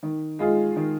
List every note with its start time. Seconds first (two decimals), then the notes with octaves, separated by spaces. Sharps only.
0.03 D#3
0.39 G#3 F4 G#4
0.76 D#3